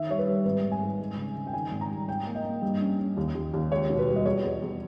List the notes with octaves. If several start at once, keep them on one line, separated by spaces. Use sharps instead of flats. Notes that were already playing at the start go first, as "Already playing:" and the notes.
Already playing: D#3 E5
G3 C#5
B4
G3
G#1 B4
G#1
G#5
G#2
G#3
C#3
C#3
G5
D#3 G#5
G#1
A#5
G3
G#2 G5
A#3
D#5
A#3
G2
C#4
C#4
D#2
D#2
D#2
C#2 C#5
B2
B4
G3
D#5
E2 C#5
E2
E2